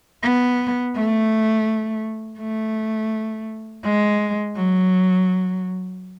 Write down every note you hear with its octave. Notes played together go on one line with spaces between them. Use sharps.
B3
A3
A3
G#3
F#3